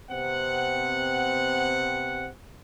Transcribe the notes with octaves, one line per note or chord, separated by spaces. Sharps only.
C3 B3 C4 F#5